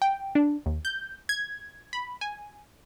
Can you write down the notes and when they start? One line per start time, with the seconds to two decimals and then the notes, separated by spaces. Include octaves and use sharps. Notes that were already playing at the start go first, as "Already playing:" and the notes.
0.02 G5
0.35 D4
0.66 D#2
0.85 G6
1.29 G#6
1.93 B5
2.21 G#5